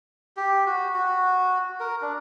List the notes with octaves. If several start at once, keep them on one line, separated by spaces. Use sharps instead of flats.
G4
F#4
F#4
A#4
D4